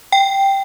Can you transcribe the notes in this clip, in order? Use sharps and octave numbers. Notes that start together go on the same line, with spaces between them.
G5